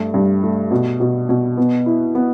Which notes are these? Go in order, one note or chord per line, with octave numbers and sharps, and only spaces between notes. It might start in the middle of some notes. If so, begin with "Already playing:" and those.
Already playing: G2 A3
G2
A3
B2
B2
B2
B3
E4
B3